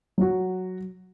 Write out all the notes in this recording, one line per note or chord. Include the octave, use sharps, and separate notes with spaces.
F#3 F#4